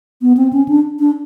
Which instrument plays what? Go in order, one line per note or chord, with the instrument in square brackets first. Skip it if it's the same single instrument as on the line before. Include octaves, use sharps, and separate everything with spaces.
[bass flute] B3
C4
C#4
D4
D4